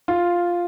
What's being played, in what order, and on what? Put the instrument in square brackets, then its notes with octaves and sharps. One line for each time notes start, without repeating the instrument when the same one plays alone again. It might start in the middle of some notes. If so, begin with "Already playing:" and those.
[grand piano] F4